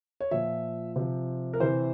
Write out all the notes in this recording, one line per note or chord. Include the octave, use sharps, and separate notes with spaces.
C#5
A#2 F3 E5
C3 F3
A#4
C3 E3 C5